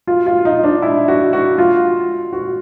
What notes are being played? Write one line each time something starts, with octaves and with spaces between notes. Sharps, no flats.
F4
F4
D#4
D4
E4
F#4
F#4
F4
F#4